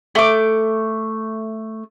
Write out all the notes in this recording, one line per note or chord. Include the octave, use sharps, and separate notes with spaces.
A3 D6